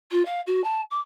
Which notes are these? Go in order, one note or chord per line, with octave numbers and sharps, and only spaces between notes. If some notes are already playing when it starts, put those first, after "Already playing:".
F4
F5
F#4
A5
D6